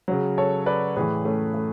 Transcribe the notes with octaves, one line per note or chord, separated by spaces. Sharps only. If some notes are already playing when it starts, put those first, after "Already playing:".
C#3 F#3
A4 C#5
B4 D5
A2 E3 G#4 B4
A3 C#4
A3